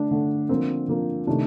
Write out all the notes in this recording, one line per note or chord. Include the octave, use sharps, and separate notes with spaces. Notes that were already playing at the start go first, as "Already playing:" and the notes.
Already playing: D3 A3 D4
D3 A3
D3 F3 A#3 C4
D3 F3 A#3
C3 D#3 A3 D4